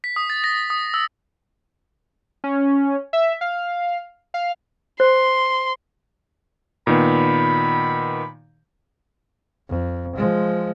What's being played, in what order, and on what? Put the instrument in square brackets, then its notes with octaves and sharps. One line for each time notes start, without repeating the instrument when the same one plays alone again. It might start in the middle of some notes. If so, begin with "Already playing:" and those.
[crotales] B6
D#6
A6
A#6
D#6
E6
[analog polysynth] C#4
E5
F5
F5
[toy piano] C5 [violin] C6
[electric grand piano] A#2 D#3 B3 [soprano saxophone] B5
[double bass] F2
F3 G#3